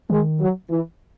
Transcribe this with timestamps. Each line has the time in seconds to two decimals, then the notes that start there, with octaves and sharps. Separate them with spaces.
0.10 D#3 G#3
0.40 F#3
0.70 E3